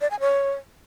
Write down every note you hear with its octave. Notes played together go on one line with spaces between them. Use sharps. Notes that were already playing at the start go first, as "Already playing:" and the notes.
D5
G#5
C#5